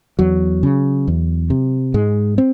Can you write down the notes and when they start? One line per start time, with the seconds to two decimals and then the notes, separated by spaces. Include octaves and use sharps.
0.19 E2 F#3
0.63 C#3
1.07 E2
1.50 C3
1.94 G#2 G#3
2.38 C4